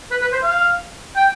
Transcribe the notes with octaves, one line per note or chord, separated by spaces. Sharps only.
B4
B4
C5
F5
G5